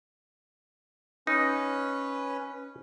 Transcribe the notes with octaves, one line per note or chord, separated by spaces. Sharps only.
C#4 D#4 B4